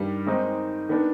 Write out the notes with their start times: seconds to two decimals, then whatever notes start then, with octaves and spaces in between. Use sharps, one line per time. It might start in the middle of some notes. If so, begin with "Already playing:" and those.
Already playing: G2 D#3 G3
0.26 D#3 G#3 C4 D#4
0.89 D#3 B3 D4